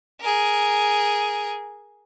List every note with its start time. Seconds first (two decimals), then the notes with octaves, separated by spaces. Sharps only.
0.21 G#4 A#4